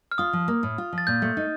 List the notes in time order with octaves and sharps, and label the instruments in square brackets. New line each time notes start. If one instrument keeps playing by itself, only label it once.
[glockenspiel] F6
[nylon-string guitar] F4 [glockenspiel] D#6
[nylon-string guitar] F3
A#3
A2
F4
F3
[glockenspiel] A6
[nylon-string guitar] A#2 [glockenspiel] G6
[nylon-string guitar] A3
D#4